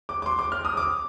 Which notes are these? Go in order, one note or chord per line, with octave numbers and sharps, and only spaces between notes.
D6
D6
C6
D6
F6
D#6
D6